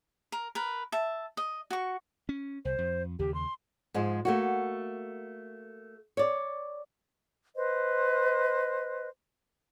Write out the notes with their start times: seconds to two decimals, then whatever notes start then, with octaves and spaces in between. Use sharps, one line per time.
0.32 A#4
0.55 A#4 B4
0.92 E5 A5
1.37 D#5
1.71 F#4 C#6
2.29 C#4
2.65 C2 C5
2.78 F2
3.19 D#2 C#3 G4
3.34 C6
3.94 G#2 F3 G#3
4.25 A3 A#3 F#4
6.17 C#5 D5
7.57 B4 C5 D#5